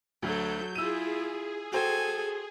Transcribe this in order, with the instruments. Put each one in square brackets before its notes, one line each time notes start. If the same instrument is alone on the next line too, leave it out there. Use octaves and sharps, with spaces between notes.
[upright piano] D2 [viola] F#3 A4 [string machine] G6
[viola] E4 F4 [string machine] G#4 [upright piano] E6 D#7
[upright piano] F#4 C5 G5 [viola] A4 G#5